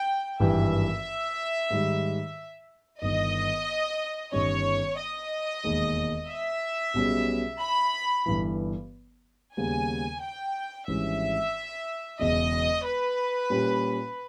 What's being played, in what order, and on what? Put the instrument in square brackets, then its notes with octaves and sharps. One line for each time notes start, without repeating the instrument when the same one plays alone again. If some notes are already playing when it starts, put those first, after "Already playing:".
Already playing: [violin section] G5
[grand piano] G#1 G2 E3 G3 [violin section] E5
[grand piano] G#2 D#3 G3
[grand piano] G1 G2 D#3 [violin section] D#5
[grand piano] G1 G2 D#3 G3 C#4 [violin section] C#5
[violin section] D#5
[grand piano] E1 D#2 D#3 G#3
[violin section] E5
[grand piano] B1 B2 G3 C#4 G#4
[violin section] B5
[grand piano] G1 G2 E3
[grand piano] D#2 C#3 G3 B3 [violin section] G#5
[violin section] G5
[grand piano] G#1 G#2 E3 G3 C#4 [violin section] E5
[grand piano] E1 E2 C#3 [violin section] D#5
[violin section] B4
[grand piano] A#2 G3 C#4 G4